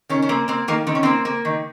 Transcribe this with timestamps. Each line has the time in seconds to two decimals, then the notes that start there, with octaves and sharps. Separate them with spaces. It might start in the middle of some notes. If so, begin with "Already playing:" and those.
0.09 D#3 C#4
0.22 C#4
0.29 A#3 C4
0.48 A#3 C4
0.68 D#3 A#3
0.87 D#3 C4
0.95 C#4
1.03 A#3 C4
1.25 A#3
1.45 D#3